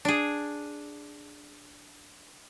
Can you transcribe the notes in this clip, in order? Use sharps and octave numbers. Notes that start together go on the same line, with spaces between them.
D4 G#4